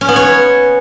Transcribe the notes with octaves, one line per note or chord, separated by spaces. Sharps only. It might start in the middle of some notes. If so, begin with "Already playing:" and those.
C#4
B3
C#5